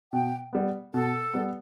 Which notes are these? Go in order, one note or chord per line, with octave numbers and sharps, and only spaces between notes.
B2 G5
G3 B3
B2 A4
G3 B3